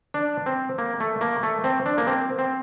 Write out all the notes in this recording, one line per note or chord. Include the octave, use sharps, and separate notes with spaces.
D4
C4
A#3
A3
A#3
A3
C4
D4
A#3
C4
C4